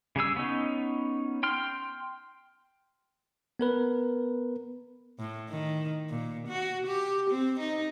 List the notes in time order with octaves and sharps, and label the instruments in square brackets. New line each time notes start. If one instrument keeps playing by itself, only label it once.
[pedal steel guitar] C#3 G3 G#4 E6
B3 C#4 D#4
G5 C6 F6
[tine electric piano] B3 A#4 B4
[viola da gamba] A2
D#3
A#2
F#4
G4
C4
D#4